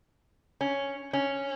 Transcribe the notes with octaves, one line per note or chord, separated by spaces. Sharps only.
C#4
C#4